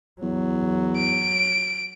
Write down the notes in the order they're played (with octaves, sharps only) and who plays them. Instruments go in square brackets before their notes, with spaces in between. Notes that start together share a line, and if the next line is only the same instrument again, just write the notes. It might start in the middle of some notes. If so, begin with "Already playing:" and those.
[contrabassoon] E2 [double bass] F#3
[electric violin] D7